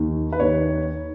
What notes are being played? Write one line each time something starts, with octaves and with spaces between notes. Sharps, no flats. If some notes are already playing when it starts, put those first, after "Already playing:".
Already playing: D#2 D#3
B4
D#2 D#3 C#5